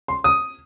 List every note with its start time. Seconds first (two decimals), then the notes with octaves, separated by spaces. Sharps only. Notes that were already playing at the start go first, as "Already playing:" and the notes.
0.08 C6
0.24 D#6